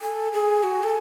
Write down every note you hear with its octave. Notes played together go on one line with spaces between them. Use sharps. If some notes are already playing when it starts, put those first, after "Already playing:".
A4 G#5
G#4
F#4
A4